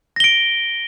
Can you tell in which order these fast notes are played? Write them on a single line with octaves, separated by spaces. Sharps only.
A#6 G7 D7